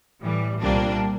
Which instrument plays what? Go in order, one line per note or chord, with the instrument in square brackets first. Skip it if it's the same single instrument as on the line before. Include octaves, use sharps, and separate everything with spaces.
[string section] A2 E3 G3
C2 A#2 G3 A#3 D4